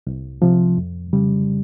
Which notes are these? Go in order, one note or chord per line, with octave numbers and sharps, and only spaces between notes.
C2
C3 F3
F2
C#3 G3